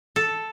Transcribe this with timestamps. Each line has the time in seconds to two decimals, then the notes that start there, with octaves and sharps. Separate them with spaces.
0.16 A4